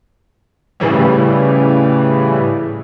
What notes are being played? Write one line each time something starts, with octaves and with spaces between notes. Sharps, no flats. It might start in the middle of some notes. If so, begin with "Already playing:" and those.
A2 C#3 E3 G3